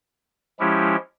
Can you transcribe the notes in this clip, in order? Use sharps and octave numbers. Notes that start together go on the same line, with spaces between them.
F3 G#3 C#4 E4 G4